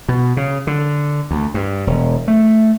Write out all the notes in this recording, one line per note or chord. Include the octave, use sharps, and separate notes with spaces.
B2
C#3
D3
D2
G2
E1
A3